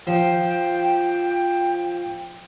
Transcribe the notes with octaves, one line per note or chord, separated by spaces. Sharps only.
F3 G5